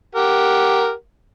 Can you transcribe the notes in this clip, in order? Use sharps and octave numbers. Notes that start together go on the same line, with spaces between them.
G4 A#4 F#5